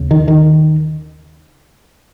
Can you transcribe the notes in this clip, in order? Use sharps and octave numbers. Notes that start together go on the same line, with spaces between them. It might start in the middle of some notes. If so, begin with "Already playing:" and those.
Already playing: D#2 C#3
D#3
D#3